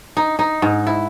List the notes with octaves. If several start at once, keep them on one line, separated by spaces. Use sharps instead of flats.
D#4
D#4
G#2
E4